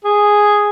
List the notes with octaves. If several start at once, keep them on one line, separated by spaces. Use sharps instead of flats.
G#4